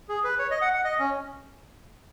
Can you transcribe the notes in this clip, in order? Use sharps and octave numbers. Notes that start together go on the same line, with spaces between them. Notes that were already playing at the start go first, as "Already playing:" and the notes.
G#4
B4
C#5
D#5
F#5
F#5
D#5
C#4